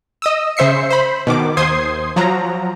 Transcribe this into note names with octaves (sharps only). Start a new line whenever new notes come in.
D#5 D#6 E6
C#3 C5 E5 C7 C#7
C5 B5
B2 D#3 D6
D#2 C5 C6 D#6 G#6 C7
F3 F#3 A#5